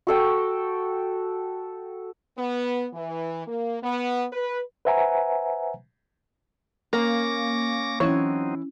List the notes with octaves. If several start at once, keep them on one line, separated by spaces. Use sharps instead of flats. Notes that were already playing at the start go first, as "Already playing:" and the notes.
F#4 A4 G5
B3
E3
A#3
B3
B4
B4 C5 E5 F#5 G#5 A#5
A#3 C#4 A#4 D6 A#6
E3 F#3 C4 C#4 D#4 E4 C#5